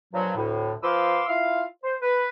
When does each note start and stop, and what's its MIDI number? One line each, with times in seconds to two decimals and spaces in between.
0.14 0.35 43
0.14 0.35 46
0.14 0.35 53
0.14 0.35 54
0.36 0.72 38
0.36 0.72 45
0.83 1.23 53
0.83 1.23 71
0.83 1.23 77
0.83 1.23 84
0.83 1.23 86
0.83 1.23 88
1.29 1.63 64
1.29 1.63 65
1.29 1.63 77
1.84 1.95 72
2.01 2.29 71